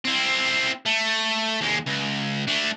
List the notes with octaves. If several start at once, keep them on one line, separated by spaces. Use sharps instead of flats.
C4 E4
A3
D#2 G#3
C#2
A3 D4